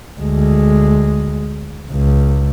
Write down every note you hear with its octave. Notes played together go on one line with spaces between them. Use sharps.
D2 G#3
C#2